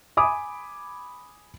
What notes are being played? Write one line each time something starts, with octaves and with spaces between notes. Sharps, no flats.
G#5 B5 D6 D#6